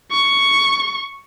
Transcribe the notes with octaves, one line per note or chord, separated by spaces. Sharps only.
C#6